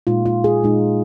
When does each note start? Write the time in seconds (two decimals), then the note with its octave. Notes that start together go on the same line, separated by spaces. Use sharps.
0.07 A#2 G#3 D#4 F4
0.26 F4
0.44 G#4
0.63 A#2 G#3 D#4